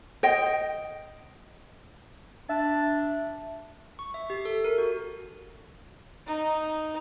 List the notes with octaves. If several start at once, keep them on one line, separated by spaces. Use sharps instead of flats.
C5 D#5 G5
D4 E5 A5
C#6
E5
G4
A4
A#4
F#4
D#4